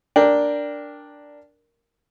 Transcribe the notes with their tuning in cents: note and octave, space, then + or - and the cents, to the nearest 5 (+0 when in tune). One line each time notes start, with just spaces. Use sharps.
D4 +0 A#4 +0 G5 +10